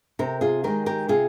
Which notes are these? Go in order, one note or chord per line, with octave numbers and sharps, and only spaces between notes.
C3 G4 A#4
F4 G#4
D#3 G#3 G4 A#4
G4 A#4
C3 F4 G#4